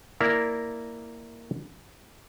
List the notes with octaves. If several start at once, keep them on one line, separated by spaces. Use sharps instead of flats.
A#3 E4 A#4 D5